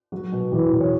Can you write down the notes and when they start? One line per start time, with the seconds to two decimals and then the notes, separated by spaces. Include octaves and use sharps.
0.12 F#3 F#4
0.32 B2
0.52 E2
0.72 E2
0.80 C#5